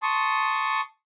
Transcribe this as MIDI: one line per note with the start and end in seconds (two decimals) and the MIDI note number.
0.03 0.81 81
0.03 0.81 84
0.03 0.81 85
0.03 0.81 87